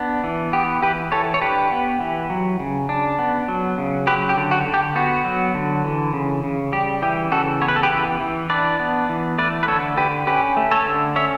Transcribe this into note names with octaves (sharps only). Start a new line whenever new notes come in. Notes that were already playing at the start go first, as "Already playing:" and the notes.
Already playing: B3 D4
E3
B3 G4
E3 G4 B4
E3 A4 C#5
C#5
D4 G4 B4
B3
E3
F#3
C#3
D4
B3
F#3
C#3
F#3 G4 B4
G4
D3
F#4
D3
G4
B3 F#4
F#3
D3
E3
C#3
C#3
G3 G4
E3 G4
C#3 F#4 A4
B3 C#5
B4
A4
G4 B4
E3
E3
D4 B4 D5
B3
E3
A3 B4 D5
B4
D3 A4 C#5
D3 G4 B4
C#4 G4 B4
A3
A4 C#5
D3
C#4 C#5 E5